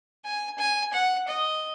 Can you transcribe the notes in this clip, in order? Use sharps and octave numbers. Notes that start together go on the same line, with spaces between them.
G#5
G#5
F#5
D#5